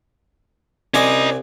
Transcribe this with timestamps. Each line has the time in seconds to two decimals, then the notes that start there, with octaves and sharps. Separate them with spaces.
0.94 C2 C#4 D5 D#5 G#5